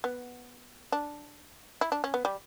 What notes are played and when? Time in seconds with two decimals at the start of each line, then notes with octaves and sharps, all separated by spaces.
0.04 B3
0.92 D4
1.81 E4
1.92 D4
2.04 C#4
2.14 B3
2.25 G3